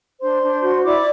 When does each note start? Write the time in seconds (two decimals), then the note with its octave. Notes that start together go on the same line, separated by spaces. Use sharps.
0.21 D4 C5 C6
0.43 D4
0.63 F#4
0.84 E4 D5 D6